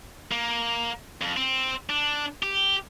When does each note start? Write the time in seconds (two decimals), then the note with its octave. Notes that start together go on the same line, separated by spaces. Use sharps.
0.32 A#3
1.22 F2
1.37 C4
1.90 D4
2.43 G4